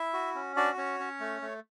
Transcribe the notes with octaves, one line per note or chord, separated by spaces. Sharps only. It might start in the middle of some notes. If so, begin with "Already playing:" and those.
Already playing: E4 E5
F#4
C#4
D4 F#4 D5
C#4 C#5
C#4
A3
A3